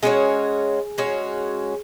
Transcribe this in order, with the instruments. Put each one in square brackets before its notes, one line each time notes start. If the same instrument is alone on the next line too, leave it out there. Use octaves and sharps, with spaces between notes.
[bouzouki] G#3 C#4 F#4 C#5 [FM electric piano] G#4
[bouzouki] G#3 C#4 F#4 C#5